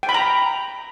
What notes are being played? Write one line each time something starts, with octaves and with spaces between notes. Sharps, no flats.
G5
B5
A#5